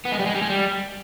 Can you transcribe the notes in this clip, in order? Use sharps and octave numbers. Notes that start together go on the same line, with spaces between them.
B3
G#3
G3
G#3
G3
G#3
G3